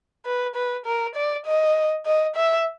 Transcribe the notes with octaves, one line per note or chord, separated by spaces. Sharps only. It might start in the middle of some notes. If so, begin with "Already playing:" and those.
B4
B4
A#4
D5
D#5
D#5
E5